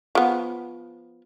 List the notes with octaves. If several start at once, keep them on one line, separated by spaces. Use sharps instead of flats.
F3 B3